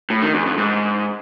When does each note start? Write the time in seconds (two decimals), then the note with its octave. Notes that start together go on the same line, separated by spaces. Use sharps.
0.10 A2
0.22 D#3
0.34 E2
0.46 F2
0.58 G#2